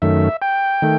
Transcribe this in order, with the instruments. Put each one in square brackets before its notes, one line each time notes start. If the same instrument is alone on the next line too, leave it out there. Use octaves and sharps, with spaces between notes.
[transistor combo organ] F#2 D#3 A3 E5
G5
D#3 A3